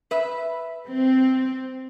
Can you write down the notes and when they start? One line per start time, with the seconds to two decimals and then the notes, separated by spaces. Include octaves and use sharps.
0.11 B4 E5
0.90 C4